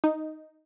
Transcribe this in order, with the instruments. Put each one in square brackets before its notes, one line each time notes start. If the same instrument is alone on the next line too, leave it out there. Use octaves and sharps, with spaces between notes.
[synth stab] D#4